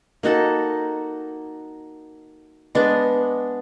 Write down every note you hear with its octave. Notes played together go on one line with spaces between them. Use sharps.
A#3 D#4 F#4 A4
G#3 B3 D4